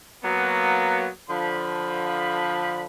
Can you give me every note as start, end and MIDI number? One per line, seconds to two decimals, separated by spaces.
0.24 1.07 54
0.24 1.07 58
0.24 1.07 59
1.29 2.86 50
1.29 2.86 53
1.29 2.86 83